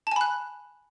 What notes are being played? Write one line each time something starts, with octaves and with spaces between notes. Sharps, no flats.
G#5 A5 B5 F#6